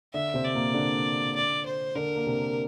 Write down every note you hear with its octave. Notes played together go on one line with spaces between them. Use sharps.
D3 D4 E5
C3 C4
D5
A#2 A#3
D3 D4
D5
C5
D3 D4 A#4
A#3
C3 C4